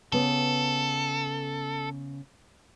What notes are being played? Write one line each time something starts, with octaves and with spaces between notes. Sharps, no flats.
C#3 B3 A4